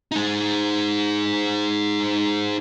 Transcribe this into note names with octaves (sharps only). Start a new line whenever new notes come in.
G#3 D#4